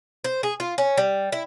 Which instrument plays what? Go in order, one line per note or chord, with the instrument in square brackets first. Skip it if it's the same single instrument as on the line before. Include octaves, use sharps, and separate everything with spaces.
[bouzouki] C5
G#4
F4
C#4
G3
E4